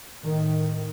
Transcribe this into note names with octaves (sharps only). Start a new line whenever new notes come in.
A2 D#3